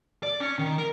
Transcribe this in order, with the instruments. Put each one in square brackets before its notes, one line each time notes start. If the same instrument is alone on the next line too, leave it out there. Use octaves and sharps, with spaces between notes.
[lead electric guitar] D5
C#4
D#3
A#4